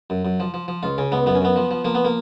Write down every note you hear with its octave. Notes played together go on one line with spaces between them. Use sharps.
F#2
F#2
F3
F3
F3
C#2 F4
C#3 C#4
C#2 B3
F#2 B3
C#4
F#2 B3
F3
F3
F3 A#3
B3
A#3